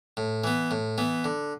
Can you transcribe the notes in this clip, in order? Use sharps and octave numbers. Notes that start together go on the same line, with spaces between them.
A2
E3 B3
A2
E3 B3
D3